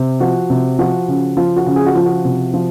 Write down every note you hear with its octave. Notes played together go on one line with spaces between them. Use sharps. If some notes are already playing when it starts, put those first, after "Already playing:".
Already playing: C3
F3 F#4
C3
F3 F#4
C#3
F3 F4
F#4
C#3
G#4
F#4
F3 F4
F#4
C3
F3